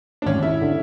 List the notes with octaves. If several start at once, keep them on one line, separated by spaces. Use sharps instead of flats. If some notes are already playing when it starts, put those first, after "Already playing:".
D4
G#1 C#4
E4
D3